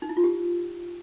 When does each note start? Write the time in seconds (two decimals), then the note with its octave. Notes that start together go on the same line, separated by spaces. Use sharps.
0.02 D#4
0.09 E4
0.17 F4
0.24 G4